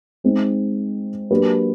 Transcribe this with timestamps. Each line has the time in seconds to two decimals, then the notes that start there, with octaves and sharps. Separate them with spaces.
0.24 G#3 C4 D#4
1.31 F#3 A#3 D4 G4 B4